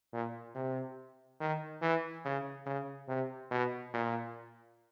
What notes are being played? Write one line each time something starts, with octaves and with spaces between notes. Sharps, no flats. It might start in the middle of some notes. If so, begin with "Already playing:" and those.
A#2
C3
D#3
E3
C#3
C#3
C3
B2
A#2